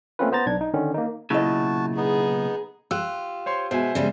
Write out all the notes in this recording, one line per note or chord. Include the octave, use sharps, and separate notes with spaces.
A3 A#3 C4 C#4 F4 B4
B3 C5 A#5 A6
B1 D4 G#6
D#4
D3 D#3 C#4
A#3 D#4
B1 A#2 C#3 E4 F#4 D#5 A5
B3 D#4 G#4
F4 G4 E6 F#6
C5 C#5 C6
B2 G#3 C5 E5 G#5
C#3 G3 G#3